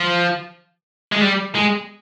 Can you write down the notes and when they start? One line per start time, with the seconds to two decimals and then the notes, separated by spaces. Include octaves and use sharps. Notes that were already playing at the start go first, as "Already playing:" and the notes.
Already playing: F3
1.12 G#3
1.21 G3
1.55 G#3